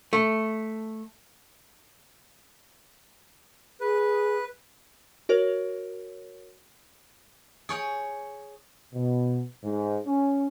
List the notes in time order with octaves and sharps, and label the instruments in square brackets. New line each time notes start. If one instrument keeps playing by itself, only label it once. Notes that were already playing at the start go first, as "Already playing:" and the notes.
[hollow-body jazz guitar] A3
[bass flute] G#4 [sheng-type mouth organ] B4
[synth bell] F#4 A#4 C#5
[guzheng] G#4 C#5 G5
[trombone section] B2
G#2
C#4